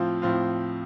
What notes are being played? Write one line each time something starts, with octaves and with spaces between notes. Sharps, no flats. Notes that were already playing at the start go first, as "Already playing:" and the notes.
Already playing: A2 F3 C4 F4
A2 F3 C4 F4